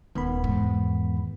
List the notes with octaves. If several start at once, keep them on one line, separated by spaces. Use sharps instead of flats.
D#1 D#3 B3 B5
E2 G#2